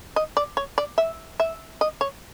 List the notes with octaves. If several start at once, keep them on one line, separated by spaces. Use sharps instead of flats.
D#5
D5
C#5
D5
E5
E5
D#5
C#5